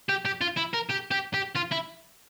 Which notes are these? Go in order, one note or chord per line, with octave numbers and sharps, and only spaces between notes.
G4
G4
F4
E4
A#4
G4
G4
G4
F4
E4